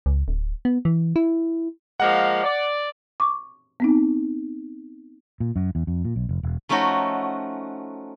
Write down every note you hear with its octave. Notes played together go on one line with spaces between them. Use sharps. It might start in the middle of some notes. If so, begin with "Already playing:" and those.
C#2
D1
B3
E3
E4
F3 G#3 A#3 F#5
D5
C#6 D6
B3 C4 D#4
A#2
F#2
E2
F2
A#2
B1
F1
E1
F3 A3 C#4 D#4 F#4